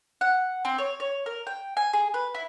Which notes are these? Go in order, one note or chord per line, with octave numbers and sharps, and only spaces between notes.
F#5
C4
C#5
C#5
A#4
G5
G#5
G#4
B4
E4